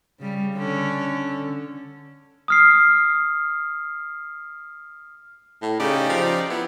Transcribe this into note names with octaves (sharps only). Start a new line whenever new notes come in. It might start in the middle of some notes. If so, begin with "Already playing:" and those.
C#3 G3
D3 C#4
D#6 F6 C7
A2
C#3 D#4 G4 D5
F3
B3 E4